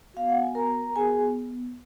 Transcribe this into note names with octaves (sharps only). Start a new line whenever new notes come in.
B3 F#4 F5
F#5
G#5
A#4 A#5
B3 F#4 G#4 G#5